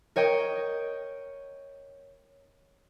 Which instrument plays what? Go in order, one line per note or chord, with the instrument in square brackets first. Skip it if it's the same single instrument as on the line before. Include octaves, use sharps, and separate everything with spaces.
[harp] A#4 C#5 D#5 G5